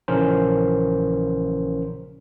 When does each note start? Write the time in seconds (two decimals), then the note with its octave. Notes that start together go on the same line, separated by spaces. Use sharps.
0.08 A#1 C#3 E3 C#4 A#4 C5